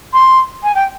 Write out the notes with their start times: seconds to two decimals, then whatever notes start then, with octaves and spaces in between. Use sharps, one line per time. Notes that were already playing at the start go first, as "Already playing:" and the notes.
0.13 C6
0.63 G#5
0.75 G5